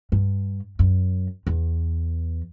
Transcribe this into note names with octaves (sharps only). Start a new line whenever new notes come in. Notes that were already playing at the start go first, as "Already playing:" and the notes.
G2
F#2
E2